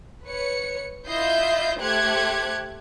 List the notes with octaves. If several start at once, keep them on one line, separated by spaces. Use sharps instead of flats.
B4 C#5 C#7
E4 F4 D#5 E5 G6 C7
A3 G4 C5 F#6 G#6 C#7